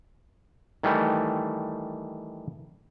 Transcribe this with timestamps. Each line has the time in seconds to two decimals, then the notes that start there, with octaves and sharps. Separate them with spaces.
0.83 D#3 E3 G3 A3